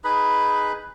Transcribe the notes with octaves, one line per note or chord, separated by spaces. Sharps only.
D#4 G#4 B4 B5